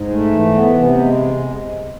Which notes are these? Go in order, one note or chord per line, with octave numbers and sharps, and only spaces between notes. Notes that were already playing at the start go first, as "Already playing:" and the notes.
Already playing: G#2
A3
E3
B3
C3
G#3